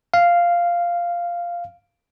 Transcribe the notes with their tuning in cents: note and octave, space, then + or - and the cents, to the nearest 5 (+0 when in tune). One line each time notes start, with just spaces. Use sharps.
F5 -5